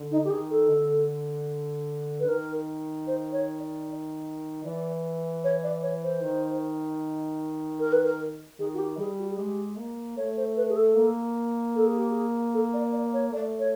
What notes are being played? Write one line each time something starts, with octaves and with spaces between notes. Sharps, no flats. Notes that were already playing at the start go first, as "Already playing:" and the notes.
Already playing: D3
D#4
G4
D#3 G#4
A4
D3
B4
D#3 A#4
C5
C#5
D5
E3 D5
C#5
D5
C#5
C5
D#3
A#4
B4
A#4
D#3 G#4
F#4
G4
G3 G#4
F#4
G#4
G#3 G4
A#3
A3 C#5
C5
B4
G#4
A4
A#3
A4
G#4
G4
G#4
A4
D5
D5
C#5
A3 D5
C#5